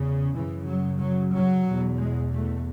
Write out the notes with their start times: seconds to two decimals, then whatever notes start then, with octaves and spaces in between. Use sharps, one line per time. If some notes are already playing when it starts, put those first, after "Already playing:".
Already playing: E2 C#3
0.35 F#2 C#3 E3
0.67 F#3
1.00 F#3
1.33 F#3
1.66 E2 B2
1.99 G#3
2.33 A3